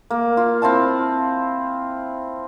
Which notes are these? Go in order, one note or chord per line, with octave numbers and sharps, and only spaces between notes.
A#3
F4
C4 E4 F4 A5